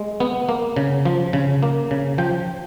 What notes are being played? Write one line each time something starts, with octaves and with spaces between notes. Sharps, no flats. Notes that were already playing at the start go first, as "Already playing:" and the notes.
Already playing: G#3
B3
A#3
C#3
F3
C#3
A#3
C#3
F3 G5